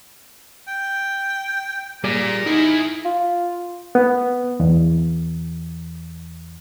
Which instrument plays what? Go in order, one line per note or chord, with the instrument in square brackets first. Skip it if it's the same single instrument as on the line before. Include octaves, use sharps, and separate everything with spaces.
[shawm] G5
[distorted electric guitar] A#2 [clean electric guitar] G3 G#4 D5 [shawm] A#4
[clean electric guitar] D#4 [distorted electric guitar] E4 G#4
[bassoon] F4
[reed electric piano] B3
E2